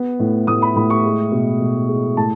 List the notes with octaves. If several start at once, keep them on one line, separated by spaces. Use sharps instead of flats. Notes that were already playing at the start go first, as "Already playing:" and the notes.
Already playing: B3
A2
A2 D#6
B5
A2 B5
C#6
G#3
B2
B2
G#3
A2 A5